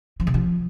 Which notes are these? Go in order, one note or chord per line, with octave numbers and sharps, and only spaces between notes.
F3
C3
F3